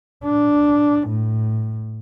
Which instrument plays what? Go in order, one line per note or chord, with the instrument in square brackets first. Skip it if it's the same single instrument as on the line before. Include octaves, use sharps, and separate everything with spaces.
[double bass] D4
A2